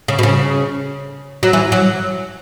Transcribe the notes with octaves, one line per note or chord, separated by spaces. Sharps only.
C#3
B2
C#3
F#3
E3
F#3